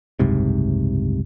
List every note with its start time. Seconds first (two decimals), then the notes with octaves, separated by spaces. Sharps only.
0.19 F#1 C2 G#2 C3